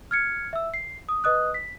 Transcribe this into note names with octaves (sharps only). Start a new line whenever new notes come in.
F6 G#6 C#7
E5 E6
C7
D#6
B4 D#5 D#6 F#6
B6